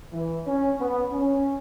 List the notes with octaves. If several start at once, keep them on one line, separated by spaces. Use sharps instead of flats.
E3
C#4
B3
C#4